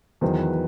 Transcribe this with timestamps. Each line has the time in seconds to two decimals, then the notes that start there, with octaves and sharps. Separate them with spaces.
0.21 E2 D#3 F#3 C5
0.38 B4
0.52 B4